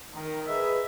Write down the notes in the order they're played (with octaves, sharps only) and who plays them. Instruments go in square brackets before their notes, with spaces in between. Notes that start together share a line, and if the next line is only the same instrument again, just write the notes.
[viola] D#3 [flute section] A#4
[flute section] G#4 B4 D#5 [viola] E5